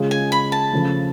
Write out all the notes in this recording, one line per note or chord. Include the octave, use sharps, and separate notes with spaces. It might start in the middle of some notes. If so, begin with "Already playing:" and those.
Already playing: C#3 G#3 C#4 F4 G#4
G#5
B5
A5
C#3 F3 A3